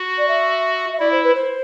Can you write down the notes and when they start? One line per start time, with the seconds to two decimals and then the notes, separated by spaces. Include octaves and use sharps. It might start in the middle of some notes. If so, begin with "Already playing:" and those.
Already playing: F#4
0.18 D5
0.28 E5
0.92 E5
1.00 E4 D5
1.11 C5
1.23 B4
1.35 C5